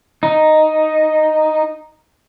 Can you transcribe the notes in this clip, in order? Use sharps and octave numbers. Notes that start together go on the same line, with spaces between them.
D#4